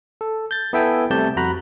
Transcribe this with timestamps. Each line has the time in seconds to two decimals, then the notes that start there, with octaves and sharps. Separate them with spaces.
0.21 A4
0.51 G6 A6
0.73 B3 E4 A4 E5 G5 G#5
1.10 C3 G3 A3 G4 A5 G6
1.36 F2 F#4 A#5 B5 F#6